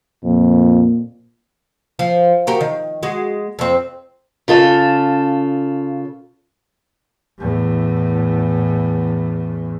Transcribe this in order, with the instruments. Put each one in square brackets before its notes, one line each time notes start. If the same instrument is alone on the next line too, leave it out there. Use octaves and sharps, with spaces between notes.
[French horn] F2 [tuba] A#2
[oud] F3
F#4 G4 A#4
D#3
G#3 F#4
F2 C4
[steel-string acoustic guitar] C#3 F4 A4
[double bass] E2 A2